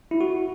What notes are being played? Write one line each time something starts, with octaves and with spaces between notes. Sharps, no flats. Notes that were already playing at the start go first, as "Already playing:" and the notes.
E4
F#4